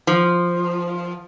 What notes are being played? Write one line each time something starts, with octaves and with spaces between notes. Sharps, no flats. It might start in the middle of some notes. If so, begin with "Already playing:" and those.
F3